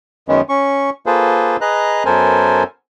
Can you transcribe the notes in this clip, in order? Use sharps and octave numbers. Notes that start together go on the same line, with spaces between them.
F#2 D#3 G#3 B3 C#4
C#4 C#6
A#3 F4 G#4 A4 B4 C5
G#4 B4 D#5 A#5 F#6
F#2 B3 A4 A#4 C5 G#5